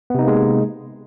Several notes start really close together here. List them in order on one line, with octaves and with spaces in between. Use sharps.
B3 C3 D#4 A#3 G#3